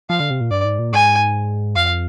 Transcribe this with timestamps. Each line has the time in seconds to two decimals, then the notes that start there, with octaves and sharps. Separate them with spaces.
0.10 F3 F5
0.20 D3
0.30 C3
0.41 A#2
0.51 G2 D5
0.65 G#2
0.79 A#2
0.93 G#2 G#5
1.76 F2 F5